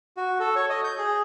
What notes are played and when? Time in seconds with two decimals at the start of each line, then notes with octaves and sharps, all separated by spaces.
0.17 F#4
0.40 A4
0.56 C#5
0.70 D#5
0.84 G6
0.98 G#4